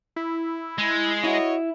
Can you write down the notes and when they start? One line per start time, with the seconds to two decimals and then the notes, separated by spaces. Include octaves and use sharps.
0.16 E4
0.78 G#3
1.24 E4 F#4 C#5 D#5